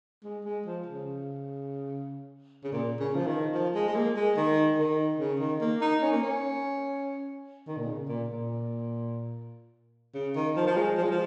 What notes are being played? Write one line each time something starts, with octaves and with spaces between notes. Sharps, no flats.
G#3
G#3
F3
C#3
C#3
A#2
C#3
F3
D#3
F3
G#3
G#3
A#3
G#3
D#3
D#3
C#3
D#3
A#3
D#4
C#4
A#3
C#4
D#3
A#2
C#3
A#2
A#2
C#3
D#3
F3
F3
G#3
F3
G#3
F3